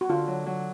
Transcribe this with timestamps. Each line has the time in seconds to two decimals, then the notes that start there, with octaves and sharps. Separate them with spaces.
0.01 F#4
0.09 D3 F4
0.27 F#3
0.46 F#3